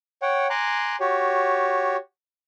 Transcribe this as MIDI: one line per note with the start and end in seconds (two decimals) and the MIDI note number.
0.22 0.47 73
0.22 0.47 78
0.22 0.47 79
0.50 0.96 80
0.50 0.96 82
0.50 0.96 84
0.50 0.96 86
0.50 0.96 90
1.00 1.96 66
1.00 1.96 67
1.00 1.96 73